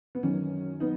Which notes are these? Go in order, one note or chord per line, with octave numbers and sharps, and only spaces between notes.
B3
F#2 D#3 F#3 C#4
B3 D#4